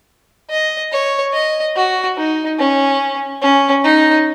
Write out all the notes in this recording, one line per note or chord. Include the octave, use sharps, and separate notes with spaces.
D#5
C#5
D#5
F#4
D#4
C#4
C#4
D#4